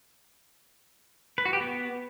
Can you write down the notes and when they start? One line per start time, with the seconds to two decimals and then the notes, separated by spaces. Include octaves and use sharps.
1.38 B4
1.46 F#4
1.53 G4
1.61 B3